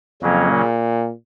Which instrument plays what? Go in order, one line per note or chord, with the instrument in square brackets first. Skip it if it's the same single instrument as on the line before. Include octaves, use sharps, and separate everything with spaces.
[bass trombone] F2 [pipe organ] C#3 F#3 A#3 C#4
[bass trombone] A#2